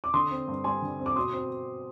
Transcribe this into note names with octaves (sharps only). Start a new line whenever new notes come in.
D6
D3 C6 D#6
C4
G2
G3 G#5 C6
D3
C4
D6
B2 C6 D#6
C4